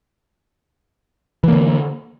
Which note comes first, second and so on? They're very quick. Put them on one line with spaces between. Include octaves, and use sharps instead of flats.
E3 A#3 D3